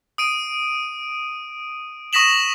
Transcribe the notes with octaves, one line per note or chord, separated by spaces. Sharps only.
D#6 D7 D#7
C#6 D#6 A#6 B6 E7 F#7